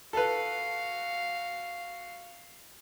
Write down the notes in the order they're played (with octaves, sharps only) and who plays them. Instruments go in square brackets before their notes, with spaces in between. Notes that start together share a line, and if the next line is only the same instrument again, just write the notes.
[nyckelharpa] F#4 F5 [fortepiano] A4 B4